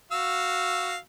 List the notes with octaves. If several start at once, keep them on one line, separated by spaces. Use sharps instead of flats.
F#4 F5 E6